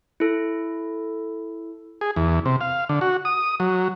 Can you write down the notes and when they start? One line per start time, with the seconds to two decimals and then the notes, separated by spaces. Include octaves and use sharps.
0.20 E4 A4
2.01 G#4
2.16 E2
2.46 C3
2.61 F5
2.89 D3
3.01 F#4
3.25 D#6
3.60 F#3